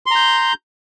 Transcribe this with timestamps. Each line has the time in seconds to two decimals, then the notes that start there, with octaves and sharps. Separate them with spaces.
0.06 C6
0.11 A#5
0.16 G6